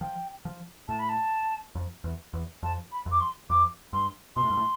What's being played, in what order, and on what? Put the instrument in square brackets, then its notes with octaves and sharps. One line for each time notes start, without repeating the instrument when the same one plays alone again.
[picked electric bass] F3 [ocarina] G5
[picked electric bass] F3
[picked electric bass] A2 [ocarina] A5
[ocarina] B5
A5
[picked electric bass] F2
E2
E2
[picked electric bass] F2 [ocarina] A5
[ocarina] B5
[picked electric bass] F2
[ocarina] D6
C6
[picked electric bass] F2 [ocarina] D6
[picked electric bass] G2 [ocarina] C6
[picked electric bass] B2 [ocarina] C6
[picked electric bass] A2
G2
A2